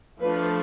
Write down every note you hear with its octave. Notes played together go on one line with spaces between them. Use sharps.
F3 A3 D4 B4